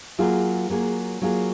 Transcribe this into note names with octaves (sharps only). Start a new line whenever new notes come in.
F#3 A#3 F4 G#4
F#3 A#3 F4 G#4
F#3 A#3 F4 G#4